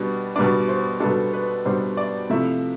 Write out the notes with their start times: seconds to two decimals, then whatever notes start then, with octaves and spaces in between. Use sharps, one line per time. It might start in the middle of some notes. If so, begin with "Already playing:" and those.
Already playing: B2 G3 B3 D4
0.36 B2 G3 B3 D4 D5
0.68 C5
1.00 B2 G3 B3 D4 A4
1.33 B4
1.65 B2 G3 B3 D4 C5
1.97 D5
2.30 C3 F3 A3 E4 E5